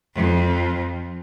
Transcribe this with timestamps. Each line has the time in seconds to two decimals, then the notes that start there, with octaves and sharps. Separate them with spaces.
0.15 F2 F3